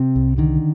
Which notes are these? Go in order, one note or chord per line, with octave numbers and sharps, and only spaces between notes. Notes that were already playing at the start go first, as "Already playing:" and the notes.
Already playing: C3 C4
C2
D3 D#3